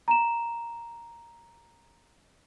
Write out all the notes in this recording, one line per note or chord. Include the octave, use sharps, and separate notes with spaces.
A#5 E7